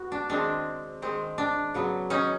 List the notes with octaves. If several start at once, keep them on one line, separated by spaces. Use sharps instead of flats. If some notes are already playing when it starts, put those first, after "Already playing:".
Already playing: B3 F#4
D4
D#3 G#3 C4 D4
D#3 G#3 C4
D4
C#3 F#3 B3
C#4 D#4